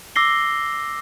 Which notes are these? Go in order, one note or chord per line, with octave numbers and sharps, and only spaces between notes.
D6 E6 A#6 C7 G7